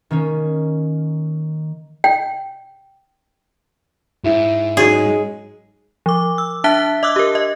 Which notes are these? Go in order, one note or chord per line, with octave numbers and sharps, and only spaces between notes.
D#3 A#3 C#4
G5
G#2 E4 E5
F#3 G#3 C#4 D#4 G#4
F3 D6
E6
D4 E5 A5 F#6 B6 G7
D#5 D6 E6 F#6
G4 A#4
D#5